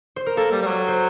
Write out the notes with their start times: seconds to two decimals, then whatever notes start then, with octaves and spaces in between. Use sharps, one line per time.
0.16 C5
0.26 A#4
0.36 A#3 A4
0.52 G3
0.62 G3
0.66 F#3
0.88 C5